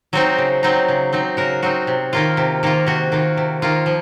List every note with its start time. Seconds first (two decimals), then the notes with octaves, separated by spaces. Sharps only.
0.13 F#3 C4 D#4 F#4
0.38 C#3
0.63 F#3 C4 D#4
0.88 C#3
1.13 F#3 C4 D#4
1.37 C#3 F#4 A#4
1.62 F#3 C4 D#4 F#4
1.87 C3
2.13 D#3 A#3 F4
2.37 C3
2.63 D#3 A#3 F4
2.87 C3 F#4
3.12 D#3 A#3 F4
3.37 C3
3.62 D#3 A#3 F4
3.86 F3